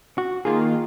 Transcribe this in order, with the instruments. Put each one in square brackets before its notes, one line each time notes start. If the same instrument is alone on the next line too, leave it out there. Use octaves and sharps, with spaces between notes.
[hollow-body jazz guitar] F#4
[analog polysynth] D#3 A#3 F4 [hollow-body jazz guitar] G#4